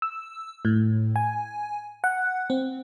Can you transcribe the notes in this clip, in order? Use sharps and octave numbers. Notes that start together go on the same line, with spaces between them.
E6
A2
G#5
F#5
C4